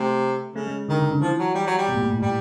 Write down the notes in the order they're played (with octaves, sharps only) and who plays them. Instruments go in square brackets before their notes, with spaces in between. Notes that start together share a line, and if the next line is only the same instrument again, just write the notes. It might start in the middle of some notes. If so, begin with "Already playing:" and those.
Already playing: [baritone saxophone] C3 [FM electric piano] A3
[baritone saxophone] C#3 [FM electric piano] A3
[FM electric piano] G#3
[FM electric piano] D3 [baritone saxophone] D#3
[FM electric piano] C#3
D3
[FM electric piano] E3 [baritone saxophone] F3
[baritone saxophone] F#3
G3
F#3
G3
[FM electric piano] B2
A2
A#2
A2
[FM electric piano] A2 [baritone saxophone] G3